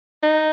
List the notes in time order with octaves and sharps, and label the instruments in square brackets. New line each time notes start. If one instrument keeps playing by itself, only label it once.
[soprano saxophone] D#4